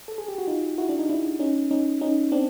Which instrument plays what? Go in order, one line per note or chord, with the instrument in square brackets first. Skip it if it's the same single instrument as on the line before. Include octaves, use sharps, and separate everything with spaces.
[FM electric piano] A4
G#4
G4
F#4
D#4 F4
E4 F#4
D4
D#4
D4 E4
C#4 D#4
C#4 D#4
C#4 D#4
C4 D4